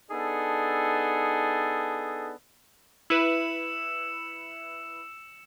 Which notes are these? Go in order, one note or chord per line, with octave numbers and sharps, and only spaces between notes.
B3 D4 D#4 G#4 A4
E4 B4 E6 C#7 E7